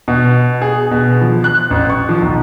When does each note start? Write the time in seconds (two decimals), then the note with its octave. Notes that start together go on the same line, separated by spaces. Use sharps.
0.08 B2
0.62 G#4
0.91 B2
1.21 F3
1.44 F#6
1.71 A1
1.90 C#6
2.09 F3
2.22 B1